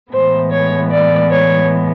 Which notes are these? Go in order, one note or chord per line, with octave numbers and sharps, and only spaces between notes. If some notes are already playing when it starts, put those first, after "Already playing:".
A2 E3 G#3 B3 C5
C#5
D5
C#5